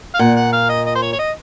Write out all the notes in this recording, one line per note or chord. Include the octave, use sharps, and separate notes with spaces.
F5
A#2 F#5
F#5
F5
D#5
D#5
C5
C#5
C#5
D#5